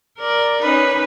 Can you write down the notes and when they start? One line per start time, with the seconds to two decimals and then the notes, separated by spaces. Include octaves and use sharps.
0.19 A#4 D5
0.62 C#4 D#4 B4